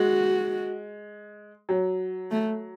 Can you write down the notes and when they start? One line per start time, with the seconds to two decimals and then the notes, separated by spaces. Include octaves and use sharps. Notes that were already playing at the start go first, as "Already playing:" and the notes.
Already playing: G#3 F#4
1.69 F#3
2.31 A3